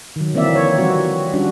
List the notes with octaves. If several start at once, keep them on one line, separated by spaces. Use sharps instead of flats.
D#3 F#3
D3 E3 A#3 C4 D5 E5
C#5
F3 G3 C4 F#4
G3 C#4 D4 F4 F#4